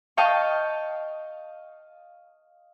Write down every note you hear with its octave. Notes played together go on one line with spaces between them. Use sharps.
D#5 F5 G5 A5 C#6